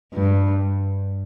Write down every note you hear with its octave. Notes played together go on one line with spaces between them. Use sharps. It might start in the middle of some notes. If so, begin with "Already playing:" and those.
G2